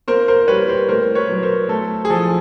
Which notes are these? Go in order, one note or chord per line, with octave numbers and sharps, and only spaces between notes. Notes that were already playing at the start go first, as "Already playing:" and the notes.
A#3 A#4 C5
A#4 C5
G3 B4 C#5
A#4 C5
A3 A#4 C5
B4 C#5
F#3
A#4 C5
A3 A4
G#4
F3 A4